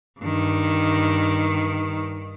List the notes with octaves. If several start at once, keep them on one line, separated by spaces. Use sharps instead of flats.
G2 D#3